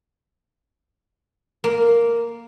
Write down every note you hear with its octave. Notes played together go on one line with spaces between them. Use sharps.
A#3